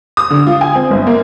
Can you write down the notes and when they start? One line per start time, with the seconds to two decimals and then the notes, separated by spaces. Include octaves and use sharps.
0.17 D#6
0.30 D3
0.47 F4
0.61 G#5
0.75 C4
0.91 G1
1.07 A#3